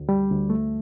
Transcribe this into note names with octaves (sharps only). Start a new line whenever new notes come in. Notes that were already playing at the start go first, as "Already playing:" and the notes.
Already playing: D2
G3
D2
A3